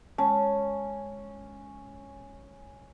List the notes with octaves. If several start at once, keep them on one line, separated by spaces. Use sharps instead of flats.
G#3 C#4 A5